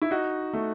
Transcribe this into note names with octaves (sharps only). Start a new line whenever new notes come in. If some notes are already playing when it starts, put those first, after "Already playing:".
E4
D#4 F#4
A3